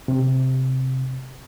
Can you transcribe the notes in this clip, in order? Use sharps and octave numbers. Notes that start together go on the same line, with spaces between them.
C3